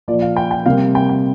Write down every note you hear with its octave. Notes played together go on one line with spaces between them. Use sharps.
A#2 F3 A#3 D5
F5
G5
G5
C3 G3 A#3 F5
G5
G5